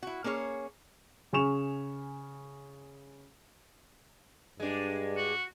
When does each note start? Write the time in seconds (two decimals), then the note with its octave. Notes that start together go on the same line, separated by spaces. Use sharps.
0.03 E4 F#4
0.24 A#3 C#4 G#4 C#5
1.33 C#3 G#5 C#6 E7 F7
4.60 G2 G#3 D4
5.17 F#4